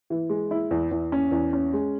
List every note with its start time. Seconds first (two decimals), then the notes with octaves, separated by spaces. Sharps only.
0.10 E3
0.29 G#3
0.51 E4
0.71 E2
0.91 E2
1.12 C#4
1.31 E2
1.53 C#4
1.73 G#3